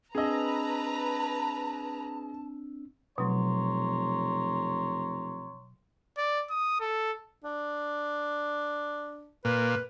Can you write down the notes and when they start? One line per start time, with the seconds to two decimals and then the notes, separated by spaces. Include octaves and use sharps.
0.15 C4 D4 G#4 B4 D#5 A5 A#5 E6
3.18 F1 B2 F#3 C#5 A#5 C6
6.18 D5
6.50 D#6
6.80 A4
7.44 D4
9.45 A#2 B4